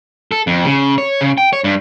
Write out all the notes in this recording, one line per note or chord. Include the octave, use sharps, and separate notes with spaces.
A4
F2
C#3
C#5
C#3
G5
C#5
G2